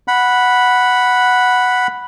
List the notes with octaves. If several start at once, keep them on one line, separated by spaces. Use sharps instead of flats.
F#5 B5